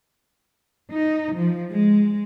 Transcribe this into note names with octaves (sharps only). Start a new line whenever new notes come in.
D#4
F3
G#3